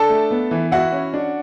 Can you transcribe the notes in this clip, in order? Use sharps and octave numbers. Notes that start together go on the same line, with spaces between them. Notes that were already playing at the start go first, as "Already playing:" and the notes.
Already playing: D4 A4 A5
A3
B3
E3
E4 F#4 F#5
C#4
D4